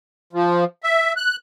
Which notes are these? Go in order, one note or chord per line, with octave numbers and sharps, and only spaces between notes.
F3
E5
F#6